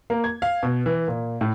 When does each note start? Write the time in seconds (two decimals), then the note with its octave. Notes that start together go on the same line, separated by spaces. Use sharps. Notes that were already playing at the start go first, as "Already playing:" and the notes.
0.10 A#3
0.24 G#6
0.42 F5
0.63 B2
0.86 E3
1.08 A#2
1.41 A2